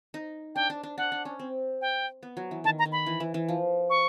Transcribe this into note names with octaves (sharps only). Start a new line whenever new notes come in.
D#4
D4 G5
D4
D4
D4 F#5
D4
C#4
C4
G5
B3
F#3
E3
D#3 A5
A#5
D#3
B5
E3
E3
E3
F3
C#6